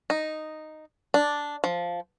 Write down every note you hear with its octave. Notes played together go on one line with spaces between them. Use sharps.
D#4
D4
F3